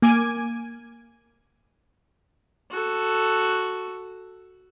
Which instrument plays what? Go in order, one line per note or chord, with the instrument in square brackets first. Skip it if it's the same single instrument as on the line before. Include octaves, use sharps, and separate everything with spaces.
[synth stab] A#3 G#5 D6 G#6 D#7
[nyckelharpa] F#4 A4